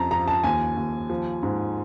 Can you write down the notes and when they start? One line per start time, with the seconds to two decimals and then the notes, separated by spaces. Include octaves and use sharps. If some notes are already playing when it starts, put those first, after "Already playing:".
Already playing: F2 A5 A#5
0.11 F3 A#5
0.28 A5
0.44 D#2 G#5
0.77 D#2
1.10 F3
1.43 G#2